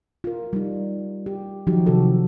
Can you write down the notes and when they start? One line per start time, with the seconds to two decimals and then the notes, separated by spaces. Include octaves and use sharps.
0.24 F4 A#4
0.53 G3 D#4
1.26 G4
1.67 D#3 F3 F#3 D#4 F#4 G4
1.86 C3 D#3 F#4 A4